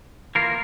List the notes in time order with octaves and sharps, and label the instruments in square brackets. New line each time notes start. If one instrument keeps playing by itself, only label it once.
[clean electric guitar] E3 A#3 F4 A#4